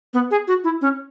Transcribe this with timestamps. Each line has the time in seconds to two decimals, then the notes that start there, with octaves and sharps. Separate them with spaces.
0.14 B3
0.31 G#4
0.48 F#4
0.64 E4
0.81 C#4